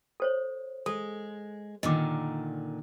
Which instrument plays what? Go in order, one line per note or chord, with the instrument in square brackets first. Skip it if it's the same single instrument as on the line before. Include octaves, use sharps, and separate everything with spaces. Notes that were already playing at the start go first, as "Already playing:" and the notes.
[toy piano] A4 C5 C#5
[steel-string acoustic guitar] G#3 [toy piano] A4
[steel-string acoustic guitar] A#2 D3 D#3 [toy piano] D#5 D6